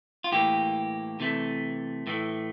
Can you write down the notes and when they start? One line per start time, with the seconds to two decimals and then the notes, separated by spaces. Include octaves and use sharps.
0.24 F4
0.32 A2 E3 A#3 G4
1.20 C3 E3 A3
2.07 A2 E3 A3